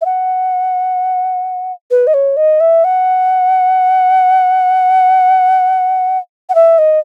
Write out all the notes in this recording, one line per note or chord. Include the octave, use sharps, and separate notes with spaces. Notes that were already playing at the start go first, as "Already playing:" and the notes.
E5
F#5
B4
D#5
C#5
D#5
E5
F#5
F#5
E5
D#5